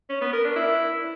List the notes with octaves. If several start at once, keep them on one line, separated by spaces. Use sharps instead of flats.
C#4
B3
A#4
D4
E4